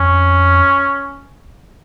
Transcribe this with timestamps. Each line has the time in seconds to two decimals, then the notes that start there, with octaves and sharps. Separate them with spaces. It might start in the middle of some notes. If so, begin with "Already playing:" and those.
Already playing: F2 C#4